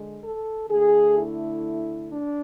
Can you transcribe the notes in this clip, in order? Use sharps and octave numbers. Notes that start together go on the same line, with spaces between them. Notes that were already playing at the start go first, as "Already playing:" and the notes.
Already playing: D3 G#3
A4
D3 A3 G#4
E4
D4